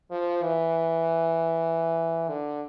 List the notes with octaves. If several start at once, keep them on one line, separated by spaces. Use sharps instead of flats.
F3
E3
D3